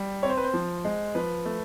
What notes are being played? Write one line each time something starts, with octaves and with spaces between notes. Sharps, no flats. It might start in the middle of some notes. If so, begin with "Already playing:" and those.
Already playing: G3
C4 C#5
C5
B4
C5
F3
G#3
F3 B4
A3